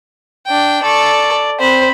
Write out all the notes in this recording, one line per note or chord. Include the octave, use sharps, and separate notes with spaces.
D4 G5
A4 D5 C#6
C4 C5 B5